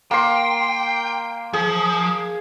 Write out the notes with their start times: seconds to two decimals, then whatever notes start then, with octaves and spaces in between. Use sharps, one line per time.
0.11 A#3 G5 C6
1.53 F3 G#4